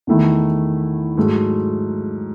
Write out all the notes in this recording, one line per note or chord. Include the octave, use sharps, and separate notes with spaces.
E2 D#3 A3 E4
G#2 F#3 A3